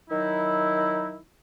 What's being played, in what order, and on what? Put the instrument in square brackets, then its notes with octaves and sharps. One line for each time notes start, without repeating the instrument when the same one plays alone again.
[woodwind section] D#3 F#3 D#4 E4